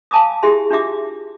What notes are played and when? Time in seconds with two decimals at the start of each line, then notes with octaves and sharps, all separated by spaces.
0.11 F5 G#5 A5 B5 D6 D#6
0.43 E4 G4 G#4 E5 G#5 C6
0.70 D4 F4 G4 E5 D6